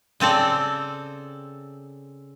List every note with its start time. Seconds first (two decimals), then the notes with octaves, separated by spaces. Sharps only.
0.20 C#3 C4 A4 D5